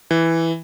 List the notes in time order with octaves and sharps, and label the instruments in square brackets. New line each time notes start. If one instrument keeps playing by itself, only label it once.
[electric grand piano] E3